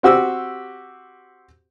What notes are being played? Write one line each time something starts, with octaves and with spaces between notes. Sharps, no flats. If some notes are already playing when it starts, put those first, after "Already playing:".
C4 F#4 G4 E6